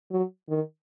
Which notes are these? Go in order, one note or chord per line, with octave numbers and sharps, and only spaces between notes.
F#3
D#3